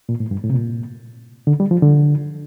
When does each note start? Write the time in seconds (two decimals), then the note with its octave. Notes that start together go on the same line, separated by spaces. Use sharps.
0.09 A#2
0.20 A2
0.31 G2
0.44 A2
0.50 C3
0.54 A#2
1.47 D3
1.60 G3
1.71 F3
1.82 D3